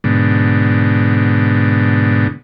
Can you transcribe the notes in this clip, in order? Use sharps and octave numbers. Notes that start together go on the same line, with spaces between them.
G#2 B2 D3